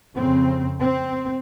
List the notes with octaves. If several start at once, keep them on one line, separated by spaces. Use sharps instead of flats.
F2 C#3 C4
C4